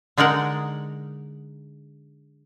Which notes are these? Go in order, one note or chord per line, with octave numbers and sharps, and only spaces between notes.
D3 G#3 D#4 A#4 F#5